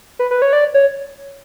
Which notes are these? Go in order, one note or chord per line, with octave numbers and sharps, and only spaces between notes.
B4
B4
C#5
D5
C#5